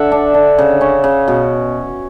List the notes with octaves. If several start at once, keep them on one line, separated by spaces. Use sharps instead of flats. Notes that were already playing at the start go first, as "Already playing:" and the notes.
Already playing: D3 E5 F#5
D4
D3
C#3
C#4
C#3
B2